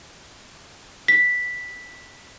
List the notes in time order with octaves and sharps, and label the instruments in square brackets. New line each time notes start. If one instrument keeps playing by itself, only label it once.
[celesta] B6